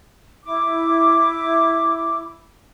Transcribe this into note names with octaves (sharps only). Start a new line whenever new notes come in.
E4 D6